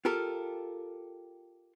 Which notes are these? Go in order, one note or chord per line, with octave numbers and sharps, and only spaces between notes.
F4 G4 A4 A#4